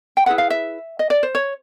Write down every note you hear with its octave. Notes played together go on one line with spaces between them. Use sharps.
G5
E4 G#4 B4 F#5
F5
E5
D#5
D5
C5
C#5